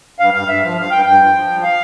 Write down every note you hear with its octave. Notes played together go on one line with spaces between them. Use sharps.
G2 F5
G2 F5
G2 E5
F3 F5
G2 F5
G2 G5
G2 G5
F3
F3
G2
F5